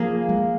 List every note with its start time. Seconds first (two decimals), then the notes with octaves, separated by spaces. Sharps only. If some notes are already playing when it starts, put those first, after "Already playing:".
Already playing: F3 A#3 G#4
0.29 G#3